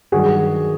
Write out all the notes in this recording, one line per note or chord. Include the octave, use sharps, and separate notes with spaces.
G2 D#3 F#3 F#4 G#4